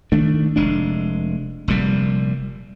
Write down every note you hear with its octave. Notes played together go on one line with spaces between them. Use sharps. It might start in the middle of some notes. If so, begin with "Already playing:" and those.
D#3 A3 D4
F1 G#3 D4
F1 A#2 G3